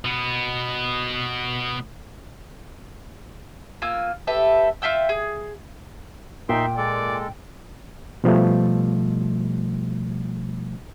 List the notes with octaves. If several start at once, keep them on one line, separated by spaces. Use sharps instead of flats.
B2 B3
A#3 F4 G#5 E6
G4 A4 B4 E5
F4 E5 G5 E6
G#4
A#2 D#4 E5 G5 C6
G#3 A4 D5
B2 F3 G3 A3